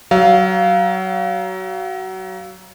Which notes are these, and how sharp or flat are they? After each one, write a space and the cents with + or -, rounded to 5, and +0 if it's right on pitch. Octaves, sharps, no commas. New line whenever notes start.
F#3 +25 F5 -5